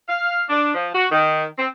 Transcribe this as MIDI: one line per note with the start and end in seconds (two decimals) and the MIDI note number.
0.09 0.43 77
0.49 0.74 62
0.74 0.89 53
0.95 1.07 66
1.12 1.45 51
1.58 1.67 60